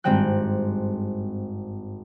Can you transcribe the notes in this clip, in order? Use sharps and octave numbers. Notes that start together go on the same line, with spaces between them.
G#1 G2 G#3 C4 G5 F#6